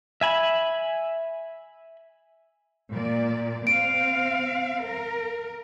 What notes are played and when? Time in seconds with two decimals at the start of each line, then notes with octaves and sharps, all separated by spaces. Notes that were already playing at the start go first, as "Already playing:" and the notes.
0.21 E5 G#5 B5
2.90 A#2 D5
3.67 C4 F5 D7
4.83 A#4